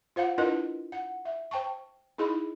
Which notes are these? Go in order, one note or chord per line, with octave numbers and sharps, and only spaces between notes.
F4 C5 F5 F#5
D4 E4 F4 A#4 B4 D#5
F#5
E5
C5 G5 A5 C#6
D#4 E4 G#4 D#5 B5